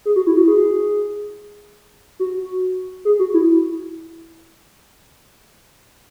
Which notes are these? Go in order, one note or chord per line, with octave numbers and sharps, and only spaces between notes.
G#4
F#4
E4
F#4
G#4
F#4
G#4
F#4
E4